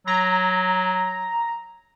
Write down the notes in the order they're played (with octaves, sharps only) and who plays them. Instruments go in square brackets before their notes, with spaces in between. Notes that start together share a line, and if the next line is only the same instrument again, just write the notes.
[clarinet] F#3 [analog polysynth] A#5